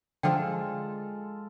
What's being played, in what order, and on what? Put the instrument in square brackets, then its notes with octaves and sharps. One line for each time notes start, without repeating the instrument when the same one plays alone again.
[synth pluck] D3 F3 [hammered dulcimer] G#3 F4 A4 [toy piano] G5